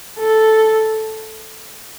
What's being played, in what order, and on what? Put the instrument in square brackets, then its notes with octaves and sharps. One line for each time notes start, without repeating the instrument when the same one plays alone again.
[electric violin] A4